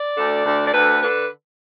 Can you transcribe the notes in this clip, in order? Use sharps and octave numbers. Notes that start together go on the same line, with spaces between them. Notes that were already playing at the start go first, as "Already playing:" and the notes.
Already playing: D5
D2 D3
D2 D3
D5
D2 D3 B4
D3 B4